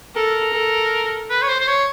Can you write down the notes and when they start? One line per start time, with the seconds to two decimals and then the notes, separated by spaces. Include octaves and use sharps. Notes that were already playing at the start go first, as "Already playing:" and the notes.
0.15 A4 A#4
0.53 A4
1.30 B4
1.42 C#5
1.48 C5
1.60 C5
1.67 C#5